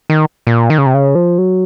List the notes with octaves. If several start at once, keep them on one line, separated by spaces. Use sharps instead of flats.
D#3
A#2
D#3
C#3
C3
C#3
F3
F#3